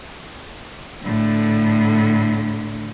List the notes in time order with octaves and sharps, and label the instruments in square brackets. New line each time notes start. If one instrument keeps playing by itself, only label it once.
[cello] A2 D3